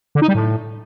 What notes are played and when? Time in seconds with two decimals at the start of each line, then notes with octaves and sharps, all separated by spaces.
0.15 D3
0.22 D#4
0.28 G3
0.35 A2